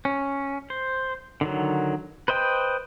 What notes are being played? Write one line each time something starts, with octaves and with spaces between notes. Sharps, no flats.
C#4
C5
D3 D#3 F#3
B4 C5 D#5 G5